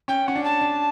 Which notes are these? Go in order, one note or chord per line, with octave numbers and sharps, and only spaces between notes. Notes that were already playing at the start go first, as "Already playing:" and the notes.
C#4 G5
C#4 F#5
D4
A5
D4